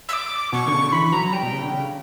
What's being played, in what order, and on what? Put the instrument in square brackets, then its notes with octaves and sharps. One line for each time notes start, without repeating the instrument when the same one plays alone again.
[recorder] E6
D6
[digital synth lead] B2 [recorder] C#6
[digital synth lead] D3
C#3
D3
[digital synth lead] E3 [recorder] B5
[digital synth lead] F#3 [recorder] A#5
[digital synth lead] G3 [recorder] G5
[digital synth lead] B2
C#3
D3
C#3